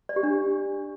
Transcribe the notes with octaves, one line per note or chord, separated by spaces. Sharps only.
D5
G4
D4